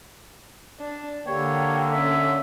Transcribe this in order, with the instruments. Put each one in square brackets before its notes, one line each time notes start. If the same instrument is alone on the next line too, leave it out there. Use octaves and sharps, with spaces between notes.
[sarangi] D4
[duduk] D3 [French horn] A#3 [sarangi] G4 [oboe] C#5
[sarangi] C#4 [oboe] E5